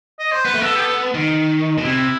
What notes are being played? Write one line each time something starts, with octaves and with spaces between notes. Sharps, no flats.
D#5
C5
B3 B4
A3
B3 A4
G4
A4
D#3
B2
C3 E4